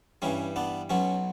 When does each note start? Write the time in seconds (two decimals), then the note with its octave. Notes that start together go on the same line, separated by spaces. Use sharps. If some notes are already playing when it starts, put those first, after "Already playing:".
0.22 G2 E3 G3 C#4
0.56 B3 D4
0.90 B1 B2 F#3 C#4